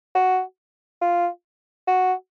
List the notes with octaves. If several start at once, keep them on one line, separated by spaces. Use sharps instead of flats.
F#4
F4
F#4